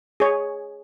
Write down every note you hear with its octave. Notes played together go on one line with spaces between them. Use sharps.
G#4 C#5